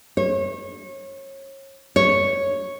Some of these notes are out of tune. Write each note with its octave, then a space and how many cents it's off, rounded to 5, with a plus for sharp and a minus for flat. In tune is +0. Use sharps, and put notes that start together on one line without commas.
C#5 -30
C#5 -5